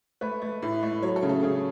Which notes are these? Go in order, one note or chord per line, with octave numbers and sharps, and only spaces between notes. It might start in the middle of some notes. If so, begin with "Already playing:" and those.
A3 B4
A3
A2
A3
F#3 C#5
A4
C#3
A4
C#3 G#4